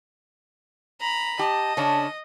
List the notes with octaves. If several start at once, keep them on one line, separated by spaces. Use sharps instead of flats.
A#5 B5
G4 D#5 A5
C#3 C#4 D4 A5